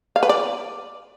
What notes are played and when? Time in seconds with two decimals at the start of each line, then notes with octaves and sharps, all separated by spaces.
0.16 F5
0.23 B4
0.29 D5